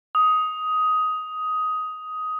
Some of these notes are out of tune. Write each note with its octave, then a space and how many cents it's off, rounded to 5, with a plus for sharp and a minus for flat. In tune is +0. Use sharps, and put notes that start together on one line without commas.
D#6 +10